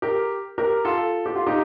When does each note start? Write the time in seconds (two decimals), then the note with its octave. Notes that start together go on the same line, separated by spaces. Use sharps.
0.02 G4 A#4
0.58 G4 A#4
0.85 F4 A4
1.26 G4
1.36 F4
1.47 D#4 G4